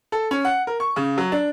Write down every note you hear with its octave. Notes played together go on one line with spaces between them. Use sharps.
A4
C#4
F#5
A#4
C#6
C#3
F#3
D4